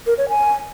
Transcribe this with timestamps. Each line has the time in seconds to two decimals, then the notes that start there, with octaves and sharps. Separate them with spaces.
0.07 A#4
0.18 C#5
0.29 G#5